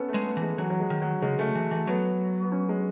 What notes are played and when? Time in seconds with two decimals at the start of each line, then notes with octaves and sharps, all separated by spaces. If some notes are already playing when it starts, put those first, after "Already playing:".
Already playing: B3 C#4 A4
0.09 A3
0.14 G#3
0.25 B3
0.37 E3
0.42 G#3
0.58 E3 F#3
0.70 F#3
0.80 G#3
0.90 D#3
1.02 F#3
1.22 C#3 G#3
1.39 C#3 A3
1.55 E3
1.71 E3 A3
1.87 F#3 B3
2.43 B3
2.52 C#4
2.69 G#3